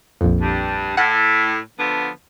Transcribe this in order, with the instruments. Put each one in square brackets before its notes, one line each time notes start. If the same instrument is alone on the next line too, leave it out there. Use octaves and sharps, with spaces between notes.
[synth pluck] A#1 F2
[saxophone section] G2
[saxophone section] A2 [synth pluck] F#5
[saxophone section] D3 F3 B3